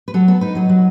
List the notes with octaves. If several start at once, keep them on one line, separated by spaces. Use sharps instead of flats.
B4
F#3 A4
B3 A4
D#4 B4
F#3 D#5
F#3